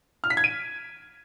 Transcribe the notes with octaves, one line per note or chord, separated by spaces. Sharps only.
F6
B6
G#6
D#7